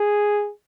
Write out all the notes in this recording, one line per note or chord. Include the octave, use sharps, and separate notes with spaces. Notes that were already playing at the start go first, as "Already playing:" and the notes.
Already playing: G#4